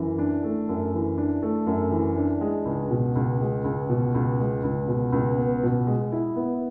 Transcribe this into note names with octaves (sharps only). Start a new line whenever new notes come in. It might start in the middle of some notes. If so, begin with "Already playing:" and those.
Already playing: F#2 E3
D4
A3
F#2
E3
D4
A3
F#2
E3
D4
G#3
C#2
B2
C#2
G#3
C#2
B2
C#2
G#3
C#2
B2
C#2
B3
B2
G#3
E4
B3